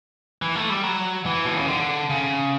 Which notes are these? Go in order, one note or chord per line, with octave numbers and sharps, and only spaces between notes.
E3
A3
G3
F#3
E3
B2
C#3
D3
C#3